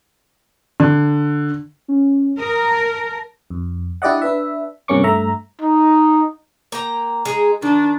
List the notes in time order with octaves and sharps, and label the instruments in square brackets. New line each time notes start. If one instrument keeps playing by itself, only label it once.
[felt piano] D3
[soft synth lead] C#4
[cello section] A#4 [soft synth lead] D#6
[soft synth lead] A5
[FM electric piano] F2
D4 E4 G4 D5 D#5 F#5
D4 B4 E5
G2 C3 A#3 C#4 C#6 D6
G2 A3 E5 A#5
[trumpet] D#4
[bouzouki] A#3 G5 A#5
G#3 D#4 G#4
[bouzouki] D#3 [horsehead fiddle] D4